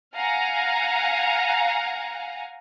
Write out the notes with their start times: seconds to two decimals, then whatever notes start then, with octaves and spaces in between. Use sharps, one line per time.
0.14 F5 F#5 G#5 A#5